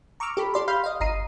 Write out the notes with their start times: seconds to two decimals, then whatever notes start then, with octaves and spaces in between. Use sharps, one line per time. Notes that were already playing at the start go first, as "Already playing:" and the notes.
0.20 A#5 C#6 D6 E6 F6
0.37 G4 A4 B5
0.54 G4 D5 C6
0.68 F5 B5 C6 F6 G6
0.84 D#5 F5
1.00 G1 D#5 A#5 C7 D#7